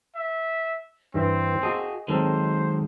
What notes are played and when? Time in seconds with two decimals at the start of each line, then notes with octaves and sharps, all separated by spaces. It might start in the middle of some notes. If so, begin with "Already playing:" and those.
0.16 E5
1.14 G2 E3 C4
1.63 F#4 G#4 D#5
2.08 D#3 F#3 G#3 C4 A4 A#4 C5